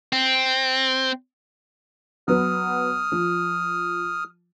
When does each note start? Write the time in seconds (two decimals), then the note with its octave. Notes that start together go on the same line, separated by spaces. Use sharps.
0.13 C4
2.28 F#3 B3 B4 D#6 F6
3.12 F3